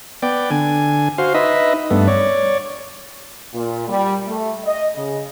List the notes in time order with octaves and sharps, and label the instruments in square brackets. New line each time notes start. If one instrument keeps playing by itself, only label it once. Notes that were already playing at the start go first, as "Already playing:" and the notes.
[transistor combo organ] B3 D5 G5
D3 G#5
F#4 C5 F5
D#4 B4 D#5 E5
G2 A3 B3
C#5 D5
[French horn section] A#2
G3
A3
D#5
C#3